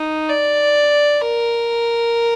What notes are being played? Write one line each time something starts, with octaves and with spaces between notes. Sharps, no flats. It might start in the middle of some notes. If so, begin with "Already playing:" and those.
Already playing: D#4
D5
A#4